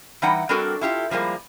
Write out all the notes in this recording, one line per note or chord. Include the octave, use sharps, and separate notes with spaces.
E3 G3 D#4 F#5 G5
G3 C4 D4 F#4 A4 A#4
E4 F4 G4 A4
F3 G3 G#3 A#3